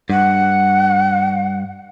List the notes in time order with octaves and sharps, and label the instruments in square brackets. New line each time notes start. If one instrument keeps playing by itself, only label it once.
[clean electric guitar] G2 [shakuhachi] F#5